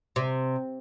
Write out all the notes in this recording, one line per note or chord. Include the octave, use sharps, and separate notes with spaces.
C3